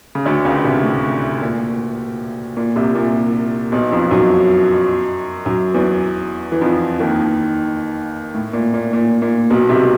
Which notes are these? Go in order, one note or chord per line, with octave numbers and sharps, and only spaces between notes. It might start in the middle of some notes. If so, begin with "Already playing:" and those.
C#3
D2 D3
C#2 C#3
C2 C3
A2
A#2
A#2
C2 C3
A#2
B1 B2
F2 F3
F#2 F#3
F#2 F#3
E2 E3
E3
F2 F3
D#2 D#3
A2
A#2
A#2
A#2
A#2
B1 B2
C2 C3